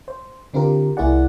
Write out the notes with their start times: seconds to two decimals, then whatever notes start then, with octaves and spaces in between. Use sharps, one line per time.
0.08 C5
0.54 D3 C4 D4 F4 G4 A#4
0.97 C2 A#3 E4 G#4 D5 F#5